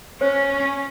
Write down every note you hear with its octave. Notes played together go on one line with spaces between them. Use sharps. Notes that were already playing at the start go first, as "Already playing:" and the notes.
C#4 C5 C#5